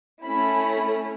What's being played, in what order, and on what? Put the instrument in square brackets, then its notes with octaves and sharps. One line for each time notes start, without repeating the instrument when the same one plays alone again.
[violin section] A3 C#4 E4 B5